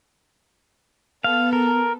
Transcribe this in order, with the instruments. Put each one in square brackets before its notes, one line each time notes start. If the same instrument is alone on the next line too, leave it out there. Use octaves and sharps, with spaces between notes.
[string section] B3 A4 [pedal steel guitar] F5
[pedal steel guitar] A#4